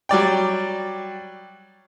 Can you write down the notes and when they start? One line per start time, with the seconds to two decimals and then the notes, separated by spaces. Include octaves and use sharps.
0.09 F#3 G3 D5 G5